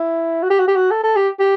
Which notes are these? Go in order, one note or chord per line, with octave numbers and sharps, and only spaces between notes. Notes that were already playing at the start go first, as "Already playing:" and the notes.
Already playing: E4
F#4
G4
F#4
G4
F#4
A4
A4
G4
G4